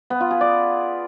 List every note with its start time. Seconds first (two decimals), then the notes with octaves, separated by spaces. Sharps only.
0.10 B3
0.20 F4
0.31 G#4
0.41 D5